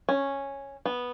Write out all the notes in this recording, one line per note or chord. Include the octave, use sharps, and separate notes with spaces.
C#4
B3